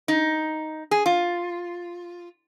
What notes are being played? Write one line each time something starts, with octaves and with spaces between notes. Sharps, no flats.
D#4
G#4
F4